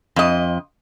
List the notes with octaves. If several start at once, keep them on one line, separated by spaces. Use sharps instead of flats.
F2 D#5